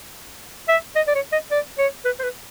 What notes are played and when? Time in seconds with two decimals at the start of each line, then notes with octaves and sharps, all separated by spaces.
0.68 E5
0.96 D#5
1.07 D5
1.15 C#5
1.32 D#5
1.51 D5
1.78 C#5
2.05 B4
2.19 C5
2.23 B4